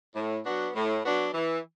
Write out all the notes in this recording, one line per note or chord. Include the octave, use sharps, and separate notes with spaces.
A2
F#3 B3 D4 F#4
A2
F#3 B3 D4 F#4
E3